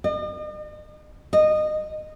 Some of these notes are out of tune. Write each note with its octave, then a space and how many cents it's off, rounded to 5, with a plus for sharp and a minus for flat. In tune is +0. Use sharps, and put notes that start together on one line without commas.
D#5 -45
D#5 -20